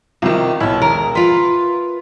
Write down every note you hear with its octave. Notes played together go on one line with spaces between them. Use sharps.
C2 D#3 F4 G4
B1 B3 E4 E5
E1 D#3 A#4
F4 B4 C6 B6